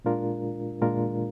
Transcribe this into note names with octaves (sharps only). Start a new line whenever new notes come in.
A#2 G#3 D4 F4 A#4
A#2 G#3 D4 F4 A#4